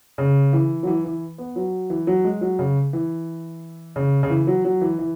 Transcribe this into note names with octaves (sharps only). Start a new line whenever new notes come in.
C#3
E3
F#3
E3
E3
B3
F#3
E3
F#3
G#3
F#3
C#3
E3
C#3
C#3
E3
F#3
F#3
E3
E3